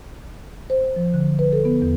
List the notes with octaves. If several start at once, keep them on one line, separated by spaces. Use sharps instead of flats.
C5
F3
D3
B4
A4
B3
E2